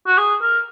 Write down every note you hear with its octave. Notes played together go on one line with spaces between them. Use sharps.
F#4
G#4
A#4